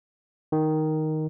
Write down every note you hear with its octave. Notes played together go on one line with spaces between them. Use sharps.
D#3